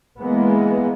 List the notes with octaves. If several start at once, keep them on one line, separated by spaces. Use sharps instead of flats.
E3 G#3 A#3 B3